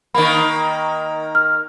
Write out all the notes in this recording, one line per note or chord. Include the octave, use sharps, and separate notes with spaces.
D#3 A#3 B5
F6